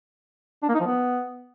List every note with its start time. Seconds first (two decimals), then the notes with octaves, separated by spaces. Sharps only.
0.63 D4
0.69 A#3
0.74 D#4
0.80 F3
0.86 B3